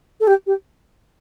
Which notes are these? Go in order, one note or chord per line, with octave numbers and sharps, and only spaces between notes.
A4
G4
G4